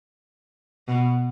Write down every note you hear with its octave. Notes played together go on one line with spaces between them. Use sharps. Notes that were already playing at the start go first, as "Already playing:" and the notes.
B2